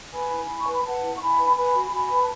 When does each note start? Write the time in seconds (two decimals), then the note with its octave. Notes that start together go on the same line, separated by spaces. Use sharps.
0.13 B4 G#5 B5
0.32 E4
0.49 E4
0.60 C#6
0.68 B4
0.73 B5
0.85 B4 F#5 A5
1.03 E4
1.15 C#6
1.21 E4 G#5 B5
1.39 B4
1.57 B4 G#5 B5
1.75 F#4
1.93 F#4 G#5 B5
2.11 B4
2.20 A5